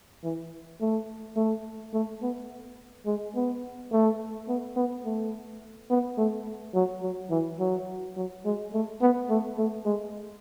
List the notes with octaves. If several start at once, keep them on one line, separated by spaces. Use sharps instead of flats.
E3
A3
A3
A3
B3
G#3
B3
A3
B3
B3
A3
B3
A3
F#3
F#3
E3
F#3
F#3
G#3
A3
B3
A3
A3
G#3